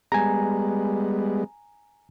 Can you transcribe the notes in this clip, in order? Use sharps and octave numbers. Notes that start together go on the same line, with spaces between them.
G3 G#3 B3 G#5 A#5